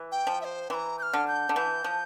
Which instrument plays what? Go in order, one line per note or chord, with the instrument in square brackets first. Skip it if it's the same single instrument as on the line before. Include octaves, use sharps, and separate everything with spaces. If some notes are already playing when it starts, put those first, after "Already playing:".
Already playing: [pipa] E3
[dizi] G5
[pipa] F3
[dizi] E5
C5
[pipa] E3 [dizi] C6
[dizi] A#5
G6
F6
[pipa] D3
[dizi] G6
[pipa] D3
[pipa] E3 [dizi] G6
[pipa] F3